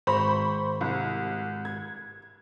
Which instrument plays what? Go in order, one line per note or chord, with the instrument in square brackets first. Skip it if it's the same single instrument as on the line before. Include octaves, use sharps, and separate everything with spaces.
[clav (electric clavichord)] G#1 A#5 [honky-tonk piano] C5 B5 C#6
[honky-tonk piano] C2
G#6